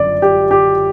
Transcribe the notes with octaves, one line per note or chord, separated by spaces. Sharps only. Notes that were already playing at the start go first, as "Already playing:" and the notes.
Already playing: G1 F#2 D5
G4
G4